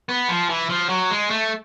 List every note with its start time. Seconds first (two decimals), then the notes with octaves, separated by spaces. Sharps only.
0.09 B3
0.28 F3
0.49 E3
0.69 F3
0.89 F#3
1.11 G#3
1.30 A3